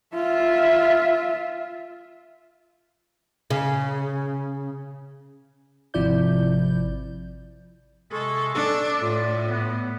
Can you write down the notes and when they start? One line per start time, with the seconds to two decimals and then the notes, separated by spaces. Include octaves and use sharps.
0.15 F4 E5
3.50 C#3
5.94 G#1 C3 F3 E4 D5 G6
8.12 C3 G#3 A4 C#6
8.54 D4 A4
9.03 A2 F4 D5
9.49 B3